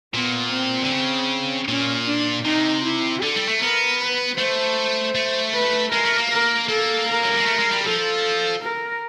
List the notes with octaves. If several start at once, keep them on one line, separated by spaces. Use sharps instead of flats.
A#2 B3
C4
D3
C#3
A#2 C#4
D4
C3 D#4
E4
D3 A4
G3
A3
B3 A#4
B4
A3 C5
A3
B4
G#3 A#4
A3
A#3
A#4
A#3 A4
A#4
F#3
G3
G#3
A3
G#3
G3
F3 A4
A#4